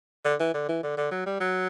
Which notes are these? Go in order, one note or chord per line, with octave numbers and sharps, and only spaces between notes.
D3
E3
D3
E3
D3
D3
F#3
G3
F#3